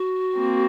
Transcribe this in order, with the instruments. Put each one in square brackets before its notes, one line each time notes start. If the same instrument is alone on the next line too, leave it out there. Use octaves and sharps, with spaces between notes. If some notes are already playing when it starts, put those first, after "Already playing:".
Already playing: [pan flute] F#4
[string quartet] A#3 C4